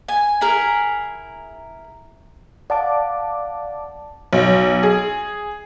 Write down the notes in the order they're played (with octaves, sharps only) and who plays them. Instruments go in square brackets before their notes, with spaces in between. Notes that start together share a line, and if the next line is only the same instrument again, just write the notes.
[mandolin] G#5
E4 G#4 A#4
[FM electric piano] D5 A5 D6 [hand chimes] F5 F#5
[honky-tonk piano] B1
G#4